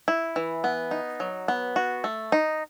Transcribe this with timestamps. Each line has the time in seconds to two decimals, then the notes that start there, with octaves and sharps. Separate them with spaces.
0.08 E4
0.36 E3
0.64 B3
0.91 D#4
1.20 F#3
1.48 B3
1.76 F#4
2.04 A3
2.32 D#4